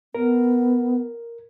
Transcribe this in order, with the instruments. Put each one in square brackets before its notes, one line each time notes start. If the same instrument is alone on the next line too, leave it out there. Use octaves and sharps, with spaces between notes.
[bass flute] B3 [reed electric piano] A#4